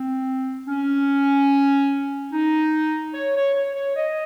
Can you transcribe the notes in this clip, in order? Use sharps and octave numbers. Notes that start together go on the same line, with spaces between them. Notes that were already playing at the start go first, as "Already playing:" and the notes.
Already playing: C4
C#4
D#4
C#5
C#5
C#5
C#5
D#5